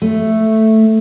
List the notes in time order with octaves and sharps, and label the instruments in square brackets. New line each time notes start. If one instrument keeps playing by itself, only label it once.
[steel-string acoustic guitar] A3